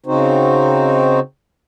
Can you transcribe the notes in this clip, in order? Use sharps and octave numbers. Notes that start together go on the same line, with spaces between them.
C#3 C4 D#4 F#4 C5